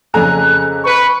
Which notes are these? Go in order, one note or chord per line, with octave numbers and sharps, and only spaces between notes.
F2 C#3 A4 G#5 A#5 F#6
B4 C#6